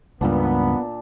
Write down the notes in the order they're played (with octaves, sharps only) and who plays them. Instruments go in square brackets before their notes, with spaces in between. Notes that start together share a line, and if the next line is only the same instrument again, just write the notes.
[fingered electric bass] C#2 G2 [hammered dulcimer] A#2 D4 [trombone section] B3